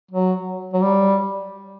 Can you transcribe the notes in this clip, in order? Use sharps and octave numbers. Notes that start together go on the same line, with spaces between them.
F#3
F#3
G3